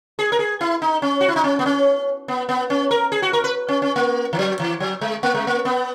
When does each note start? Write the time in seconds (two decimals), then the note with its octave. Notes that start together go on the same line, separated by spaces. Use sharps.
0.19 G#4
0.32 A#4
0.39 G#4
0.61 E4
0.82 D#4
1.02 C#4
1.21 F#4
1.28 E4
1.36 D#4
1.44 C#4
1.59 B3
1.66 C#4
2.28 B3
2.49 B3
2.70 C#4
2.91 A#4
3.12 G#4
3.22 F#4
3.33 A#4
3.44 B4
3.69 C#4
3.82 C#4
3.96 A#3
4.33 E3
4.39 F#3
4.60 E3
4.80 F#3
5.01 G#3
5.23 A#3
5.35 G#3
5.47 A#3
5.65 B3